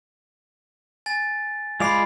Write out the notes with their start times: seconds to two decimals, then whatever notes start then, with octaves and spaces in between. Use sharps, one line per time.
1.06 G#5 A6
1.80 G#3 F4 D5 B5 C7 F7